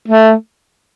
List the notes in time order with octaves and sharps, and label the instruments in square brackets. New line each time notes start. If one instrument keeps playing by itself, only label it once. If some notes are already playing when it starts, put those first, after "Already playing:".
[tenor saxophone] A3